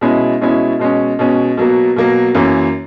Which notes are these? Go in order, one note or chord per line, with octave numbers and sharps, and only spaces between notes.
B2 G#3 C#4 E4
B2 G#3 C#4 E4
B2 G#3 C#4
B2 G#3 C#4
B2 F#3 A#3
B2 F#3 A#3
F#2 E3 A#3 C#4